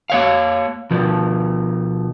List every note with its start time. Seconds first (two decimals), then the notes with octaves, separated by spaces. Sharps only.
0.10 A#3 C#5 F5
0.91 B2 F3